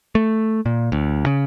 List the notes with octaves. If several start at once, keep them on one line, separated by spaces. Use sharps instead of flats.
A3
A#2
D2
C#3